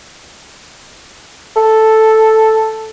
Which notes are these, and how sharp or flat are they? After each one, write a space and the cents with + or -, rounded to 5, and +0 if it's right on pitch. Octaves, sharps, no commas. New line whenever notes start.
A4 +0